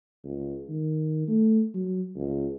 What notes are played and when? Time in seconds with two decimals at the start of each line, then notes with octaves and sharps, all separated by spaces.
0.24 C#2
0.69 D#3
1.28 A3
1.74 F#3
2.16 C#2